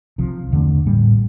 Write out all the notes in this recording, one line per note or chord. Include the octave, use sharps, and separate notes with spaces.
C2 C3 F3
E2 D3 A3 D4
A1 A2 G3 A#3